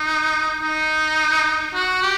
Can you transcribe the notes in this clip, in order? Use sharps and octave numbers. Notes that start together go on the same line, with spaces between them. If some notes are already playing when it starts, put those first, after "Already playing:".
Already playing: D#4
D#4
F#4
G4